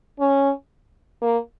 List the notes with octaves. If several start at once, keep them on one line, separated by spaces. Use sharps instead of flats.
C#4
A#3